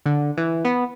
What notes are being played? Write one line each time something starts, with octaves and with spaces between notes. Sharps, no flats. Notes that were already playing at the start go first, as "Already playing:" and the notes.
D3
E3
B3